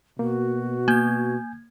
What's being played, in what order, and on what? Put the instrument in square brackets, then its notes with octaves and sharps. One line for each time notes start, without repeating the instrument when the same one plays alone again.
[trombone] B2 [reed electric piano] A#3 [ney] F#4
[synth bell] A#3 G#6 [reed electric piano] G#5 G6